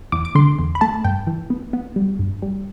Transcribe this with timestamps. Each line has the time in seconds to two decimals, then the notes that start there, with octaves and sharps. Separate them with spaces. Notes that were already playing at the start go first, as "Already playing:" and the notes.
0.12 E2 D6
0.25 D6
0.35 D3 C6
0.59 E2
0.75 B5
0.81 A3 A5
1.04 G2 G5
1.27 E3
1.50 B3
1.73 B3
1.96 G3
2.19 G2
2.42 G3